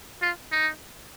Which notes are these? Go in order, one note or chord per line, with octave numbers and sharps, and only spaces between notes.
F4
D#4